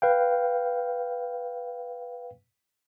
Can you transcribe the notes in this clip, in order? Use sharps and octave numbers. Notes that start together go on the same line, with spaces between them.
B4 F5 G5